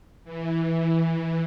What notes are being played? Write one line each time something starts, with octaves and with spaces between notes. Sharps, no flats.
E3